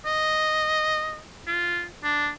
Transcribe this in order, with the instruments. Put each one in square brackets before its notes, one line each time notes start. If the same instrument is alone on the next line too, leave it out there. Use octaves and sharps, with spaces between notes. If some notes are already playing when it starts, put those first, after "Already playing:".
[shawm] D#5
F4
D4